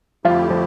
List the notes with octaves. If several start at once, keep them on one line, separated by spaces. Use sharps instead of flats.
F2 D3 F3 A3 E4 F4 G4
F3